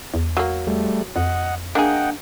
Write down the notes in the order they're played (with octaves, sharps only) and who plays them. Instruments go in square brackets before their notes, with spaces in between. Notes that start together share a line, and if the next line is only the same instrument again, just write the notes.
[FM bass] E2
[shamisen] F#3 A#3
[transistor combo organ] G3 A3
[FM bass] F2 [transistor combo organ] D#5 F#5
[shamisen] A#3 G#4 [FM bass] D4 [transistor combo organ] D#5 F#5 G5